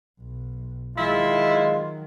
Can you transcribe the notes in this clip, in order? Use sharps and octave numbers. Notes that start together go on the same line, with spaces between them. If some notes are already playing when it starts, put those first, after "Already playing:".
B1
D#3 F#3 G#3 E4 F4